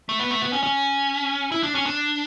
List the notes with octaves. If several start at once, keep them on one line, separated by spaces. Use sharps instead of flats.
A3
B3
A3
B3
C#4
C#4
E4
D4
C#4
D4